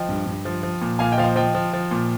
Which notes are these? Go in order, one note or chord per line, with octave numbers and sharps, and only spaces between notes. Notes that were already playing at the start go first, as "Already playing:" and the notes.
Already playing: F3 D#5 G5
G2
G2
F3
F3
A#2
A#2 F5 G#5
D#5 G5
F3 F5
C5 D#5
F3 D#5 G5
F3
F3
A#2